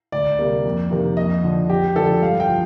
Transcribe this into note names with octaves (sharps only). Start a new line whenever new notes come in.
D2 D5
C3 G3 A#3
F2
C3 D#3 A#3
F2 D#5
D3 F3
F2 G4
D3 F3 A4
G2 F5
G5
F3